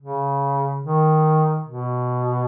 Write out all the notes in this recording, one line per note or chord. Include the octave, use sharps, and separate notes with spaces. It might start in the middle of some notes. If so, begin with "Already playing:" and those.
C#3
D#3
B2